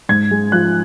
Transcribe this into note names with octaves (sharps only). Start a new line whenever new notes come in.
G#2 G#6
G#3
F3 F#6